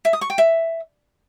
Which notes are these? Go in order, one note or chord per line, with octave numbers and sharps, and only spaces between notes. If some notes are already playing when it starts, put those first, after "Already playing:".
E5
D#6
C#6
G5
E5